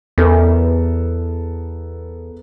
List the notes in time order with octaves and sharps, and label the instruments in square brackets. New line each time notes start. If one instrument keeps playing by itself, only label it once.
[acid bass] E2 [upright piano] B3 A4 A#4